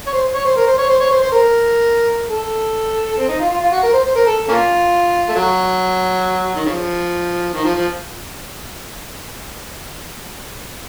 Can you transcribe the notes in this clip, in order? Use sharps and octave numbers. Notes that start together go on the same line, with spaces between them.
C#5
C5
C#5
C5
A#4
C5
C#5
C5
C#5
C5
C5
A#4
A4
C4
D#4
F4
F4
F4
F#4
A#4
C5
C5
A#4
A4
A#3 C#4 F4
A3
F#3
D#3
C#3 F3
D#3
F3
F3